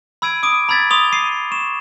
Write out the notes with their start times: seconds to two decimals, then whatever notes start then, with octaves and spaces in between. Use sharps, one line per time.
0.22 B5 E6 G#6 D7 D#7
0.43 D6 D#6 D7 D#7
0.69 A#5 B5 E6 G#6 A6 B6
0.90 C6 D6 D#6 F7 G7
1.12 D#6 C7 D#7
1.51 C#6 E7